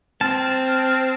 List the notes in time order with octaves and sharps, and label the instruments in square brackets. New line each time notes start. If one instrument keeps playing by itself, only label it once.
[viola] C4 [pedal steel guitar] A5 [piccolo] F6